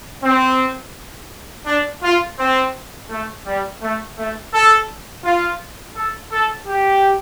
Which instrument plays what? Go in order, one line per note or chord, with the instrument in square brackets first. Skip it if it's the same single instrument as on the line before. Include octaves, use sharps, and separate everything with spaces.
[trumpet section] C4
D4
F4
C4
A3
G3
A3
A3
A4
F4
A4
A4
G4